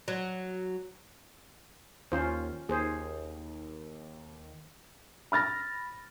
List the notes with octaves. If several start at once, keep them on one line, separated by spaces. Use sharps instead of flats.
F#3
D#2 C#4 F4 C5
D#2 G#4 C5
B5 F6 A6 A#6